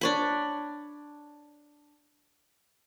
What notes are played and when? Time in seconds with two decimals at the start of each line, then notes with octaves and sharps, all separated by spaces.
0.01 D4 C#5 B5